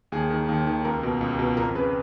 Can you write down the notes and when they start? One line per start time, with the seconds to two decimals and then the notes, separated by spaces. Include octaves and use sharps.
0.12 D#2 G#4
0.30 D#3
0.49 D#2
0.67 D#3
0.85 C#2 A#4
1.03 B2
1.21 C#2
1.39 B2
1.56 F2 A#4
1.75 C#3 B4